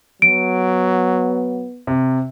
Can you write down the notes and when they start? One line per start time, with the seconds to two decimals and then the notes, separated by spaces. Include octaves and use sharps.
0.22 F#3 B3 D7
1.87 C3